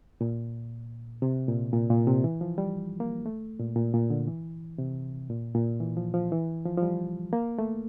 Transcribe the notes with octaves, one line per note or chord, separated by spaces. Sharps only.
A#2
C3
A#2
A#2
A#2
C3
E3
F3
G3
A#3
A3
A#2
A#2
A#2
D3
E3
C3
A#2
A#2
E3
F3
F3
E3
F3
F3
G3
A#3
A3